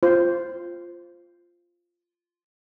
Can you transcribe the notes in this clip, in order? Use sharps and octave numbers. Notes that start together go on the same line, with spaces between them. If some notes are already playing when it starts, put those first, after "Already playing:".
F4 C5